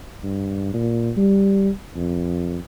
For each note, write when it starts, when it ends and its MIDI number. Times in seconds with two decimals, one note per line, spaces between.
0.24 0.71 43
0.74 1.12 46
1.17 1.70 55
1.95 2.57 41